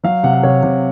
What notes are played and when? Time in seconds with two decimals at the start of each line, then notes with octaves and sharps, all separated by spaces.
0.04 F#3 F5
0.23 C3 F#5
0.33 F5
0.43 C3 C#5
0.63 C3